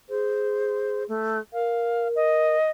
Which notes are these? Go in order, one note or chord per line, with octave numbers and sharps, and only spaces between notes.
G#4 C5
A3
A#4 F5
D#5